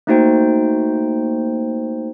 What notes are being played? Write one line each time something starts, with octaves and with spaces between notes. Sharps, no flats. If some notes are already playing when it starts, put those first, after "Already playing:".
A3 A#3 D#4 F#4 C5 G5